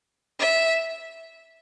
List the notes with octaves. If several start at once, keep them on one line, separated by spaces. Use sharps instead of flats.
E5